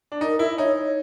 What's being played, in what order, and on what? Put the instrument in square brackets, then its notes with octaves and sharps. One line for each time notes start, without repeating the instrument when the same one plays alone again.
[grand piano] D4
[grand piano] D#4 [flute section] A#4
[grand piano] E4 [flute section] E5
[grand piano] D#4 [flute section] C#5
[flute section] C#5